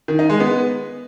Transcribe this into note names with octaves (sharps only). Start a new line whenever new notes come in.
D#3
D#4
G#3
B3